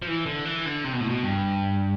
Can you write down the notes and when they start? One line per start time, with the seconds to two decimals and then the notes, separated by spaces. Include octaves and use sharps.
0.02 F3
0.07 E3
0.26 D3
0.45 E3
0.66 D3
0.84 C3
0.93 B2
1.00 A2
1.09 B2
1.23 G2